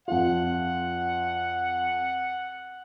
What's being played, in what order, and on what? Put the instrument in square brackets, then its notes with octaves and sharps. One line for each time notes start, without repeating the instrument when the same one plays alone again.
[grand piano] F2 F4 [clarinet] F#5